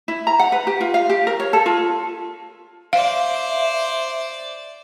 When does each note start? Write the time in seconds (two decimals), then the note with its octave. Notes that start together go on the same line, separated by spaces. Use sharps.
0.08 E4
0.27 A#5
0.39 F#5
0.52 B4
0.67 G4
0.81 F4
0.94 F5
1.10 G4
1.27 A#4
1.40 C#5
1.53 A4
1.66 F4
2.93 C5 D5 E5 F5